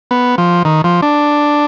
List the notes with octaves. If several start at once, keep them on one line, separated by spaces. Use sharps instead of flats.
B3
F3
D#3
F3
D4